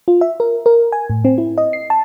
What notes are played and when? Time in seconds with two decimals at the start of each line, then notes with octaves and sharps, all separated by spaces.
0.08 F4
0.21 E5
0.40 A#4
0.66 A#4
0.92 G#5
1.10 A2
1.25 C4
1.38 E4
1.58 D#5
1.73 C7
1.90 A5